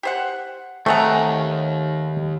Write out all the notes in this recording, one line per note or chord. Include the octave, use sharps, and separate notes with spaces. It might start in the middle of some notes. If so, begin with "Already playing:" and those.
G4 C5 F#5
D#2 A3 C4 G#4 F#5 A#5